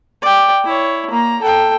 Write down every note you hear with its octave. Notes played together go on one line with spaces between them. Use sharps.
D5 G5
E4 C#5
A#3 A#5
A4 G5